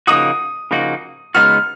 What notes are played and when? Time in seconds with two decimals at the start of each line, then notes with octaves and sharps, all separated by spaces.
0.07 C#3 F3 A#3 D#4 F#4 D#6
0.71 C#3 F3 A#3 D#4 F#4
1.34 C#3 G#3 B3 D#4 F#4 F6